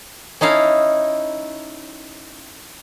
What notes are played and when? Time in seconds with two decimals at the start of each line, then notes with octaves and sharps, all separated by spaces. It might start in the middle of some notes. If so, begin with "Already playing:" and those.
0.41 C#4 D#4 E4 F5 A5